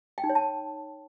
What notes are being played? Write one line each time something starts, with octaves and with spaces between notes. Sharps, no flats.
G5
D#4
C#5
A5